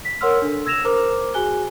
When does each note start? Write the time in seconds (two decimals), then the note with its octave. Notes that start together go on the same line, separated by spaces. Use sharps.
0.05 B6
0.21 A#4 C#5 F#5 C6 E6 F6
0.42 D4 A4
0.66 E6 G#6 A#6 E7 F7
0.85 A#4 C5 A#5 D6 F6
1.34 F#4 G#4 G#5 F#6 G7